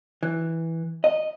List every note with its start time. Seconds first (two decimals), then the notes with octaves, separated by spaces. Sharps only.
0.23 E3
1.04 D#5